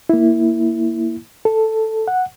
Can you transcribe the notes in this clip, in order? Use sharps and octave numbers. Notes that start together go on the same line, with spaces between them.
A#3 E4
A4
F#5